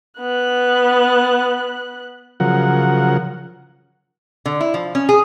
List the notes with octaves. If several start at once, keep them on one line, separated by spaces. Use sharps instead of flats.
B3 F#6
C#3 F3 F#3 A#4 F#5
D3
E4
F3
C#4
G#4